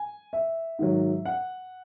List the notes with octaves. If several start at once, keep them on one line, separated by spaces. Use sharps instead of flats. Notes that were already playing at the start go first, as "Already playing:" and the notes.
Already playing: G#5
E5
G#2 D#3 F#3
F#5